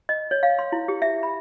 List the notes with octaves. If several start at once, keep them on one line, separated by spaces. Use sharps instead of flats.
D#5
C#5
F5
C6
E4
G4
E5
B5